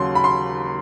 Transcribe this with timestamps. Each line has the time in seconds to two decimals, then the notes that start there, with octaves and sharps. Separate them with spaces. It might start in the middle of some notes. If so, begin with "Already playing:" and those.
Already playing: D#2 C#3 F#3 C6
0.15 B5
0.24 C6